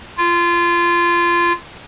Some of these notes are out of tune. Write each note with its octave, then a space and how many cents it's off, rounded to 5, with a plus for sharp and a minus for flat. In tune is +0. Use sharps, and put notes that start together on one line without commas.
F4 -20